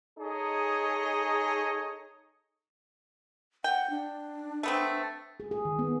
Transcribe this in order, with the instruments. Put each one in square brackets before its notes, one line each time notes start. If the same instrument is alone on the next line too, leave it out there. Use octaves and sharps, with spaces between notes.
[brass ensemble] D#4 G#4 A4 C#5 D#5
[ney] F#5 [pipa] G5
[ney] D4
[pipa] A3 B3 C4
[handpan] G#4
G#4
D#3
B3